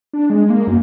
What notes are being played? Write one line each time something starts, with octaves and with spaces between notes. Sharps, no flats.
D4
G#3
A#3
F#2